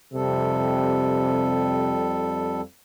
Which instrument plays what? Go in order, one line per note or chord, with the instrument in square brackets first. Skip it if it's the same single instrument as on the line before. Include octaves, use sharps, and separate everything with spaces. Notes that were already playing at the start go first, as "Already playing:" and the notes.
[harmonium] F2 G3 A4 [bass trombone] C3